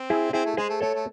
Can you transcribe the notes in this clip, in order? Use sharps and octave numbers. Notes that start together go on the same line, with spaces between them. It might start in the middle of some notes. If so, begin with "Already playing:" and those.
Already playing: C4
E4 G#4
C4 E4 G#4
A3
G#3 G#4 C5
A3
A3 A4 C#5
A3